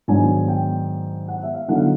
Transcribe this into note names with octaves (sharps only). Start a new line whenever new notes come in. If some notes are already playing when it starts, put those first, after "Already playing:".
G#2 D#3 F#3 B3 D4 G#5
G5
F#5
E5
F5
D3 F#3 B3 D#4 F#5
F5